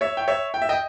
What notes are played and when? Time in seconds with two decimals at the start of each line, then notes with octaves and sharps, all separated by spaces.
0.01 C#5 E5
0.17 G5
0.28 C#5 E5
0.54 G5
0.62 E5
0.69 D#5 G5